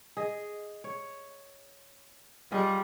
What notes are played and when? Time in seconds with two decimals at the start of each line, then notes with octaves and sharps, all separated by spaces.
0.17 G#4 D#5
0.84 C#5
2.52 G3 F4 G#4 D#5